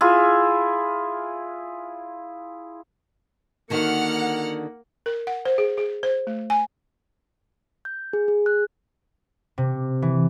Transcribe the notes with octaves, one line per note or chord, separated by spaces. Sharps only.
E4 F4 G#4
D3 D#3 A#3 F#4 F#5 F6 C#7
A#4
F#5
C5
G#4
G#4
C5
A3
G#5
G6
G#4
G#4
F#6
C3
E3